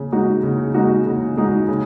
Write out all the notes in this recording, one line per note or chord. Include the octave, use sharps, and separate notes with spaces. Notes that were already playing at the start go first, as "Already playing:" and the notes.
Already playing: C#3
G#3 D#4 F#4
C#3
G#3 D#4 F#4
C#3
G#3 D#4 F#4
C#3